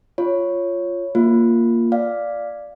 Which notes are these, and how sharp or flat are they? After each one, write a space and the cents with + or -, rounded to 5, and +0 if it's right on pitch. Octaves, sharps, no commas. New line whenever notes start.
F4 -5 C#5 +0
A#3 +0 F4 +0
D5 +0 F5 +0